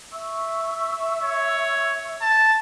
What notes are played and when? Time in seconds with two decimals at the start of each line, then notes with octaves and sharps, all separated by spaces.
0.12 E5 C#6 E6
1.23 C#5
2.22 A5